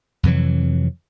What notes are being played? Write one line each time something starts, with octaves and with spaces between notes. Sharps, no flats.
F2 C3 E3 F#3